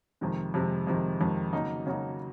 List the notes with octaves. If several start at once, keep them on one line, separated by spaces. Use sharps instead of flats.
F2 C3 D#3 G#3
F2 C3 D#3 G#3
F2 C3 D#3 G#3
F2 C3 D#3 G#3
C#3 F#3 A#3 D#4 F#4
C#3 F#3 A#3 D#4 F#4